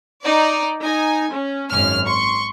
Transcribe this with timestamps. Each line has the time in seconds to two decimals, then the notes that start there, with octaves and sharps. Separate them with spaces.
0.23 D#4 D5
0.83 D#4 G#5
1.31 C#4
1.71 G#1 F#2 C#4 F6
2.06 C6 C#6